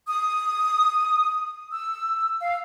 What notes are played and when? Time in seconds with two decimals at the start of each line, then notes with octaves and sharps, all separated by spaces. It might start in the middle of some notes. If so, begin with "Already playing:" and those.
0.07 D#6
1.72 E6
2.41 F5